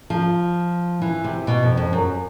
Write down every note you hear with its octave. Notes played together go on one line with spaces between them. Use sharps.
F3
E3
C3
B2
F2
F2
F#2